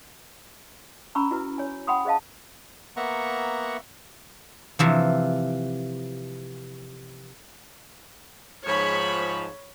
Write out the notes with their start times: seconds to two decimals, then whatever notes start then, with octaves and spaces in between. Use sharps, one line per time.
1.15 C#4 A#5 B5 C#6 E6
1.31 E4 F#4 B4
1.58 C#5 G#5
1.87 F#5 G5 B5 C6 D#6
2.05 G#4 C5 D#5 F5 A5
2.96 A#3 B3 E5 F#5 A#5 C#6
4.79 C3 E3 F3
8.66 G#2 F3 C#5 B5